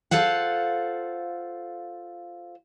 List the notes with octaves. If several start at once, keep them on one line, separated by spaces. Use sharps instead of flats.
F4 A4 C5 F5 F#5